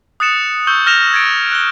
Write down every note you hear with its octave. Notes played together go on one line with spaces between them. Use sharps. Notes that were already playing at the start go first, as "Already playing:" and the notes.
D#6 F#6 A6 C#7 E7
C#6 E6 G6 G7
F6 A#6 E7 F7
G#6 A6 C#7 D7
F#6 G7